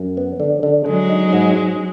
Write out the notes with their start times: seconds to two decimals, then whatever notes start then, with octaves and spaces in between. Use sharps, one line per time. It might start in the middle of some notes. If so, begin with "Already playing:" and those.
Already playing: F#2
0.17 B3
0.40 D3
0.63 D3
0.86 D3 F#3 G#3
1.10 D#4
1.33 G#2
1.56 G#2